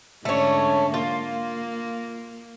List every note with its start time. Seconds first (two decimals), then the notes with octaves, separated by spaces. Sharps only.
0.25 G#2 D3 A3 C#4 C#5
0.94 A#3 F4